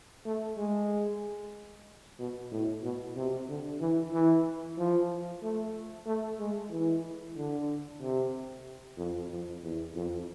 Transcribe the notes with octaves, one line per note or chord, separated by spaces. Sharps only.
A3
G#3
B2
A2
B2
C3
D3
E3
E3
F3
A3
A3
G#3
E3
D3
C3
F2
F2
E2
F2